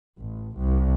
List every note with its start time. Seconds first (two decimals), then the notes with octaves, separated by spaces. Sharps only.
0.20 A1
0.56 C2